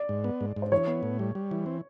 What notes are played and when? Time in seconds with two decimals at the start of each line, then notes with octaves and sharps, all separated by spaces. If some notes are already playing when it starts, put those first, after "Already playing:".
Already playing: D5
0.09 G#2
0.24 B3
0.41 G#2
0.56 G#2
0.62 C5
0.72 E3 C#5
0.88 B3
1.03 A2
1.19 G3
1.35 G3
1.51 E3
1.66 C4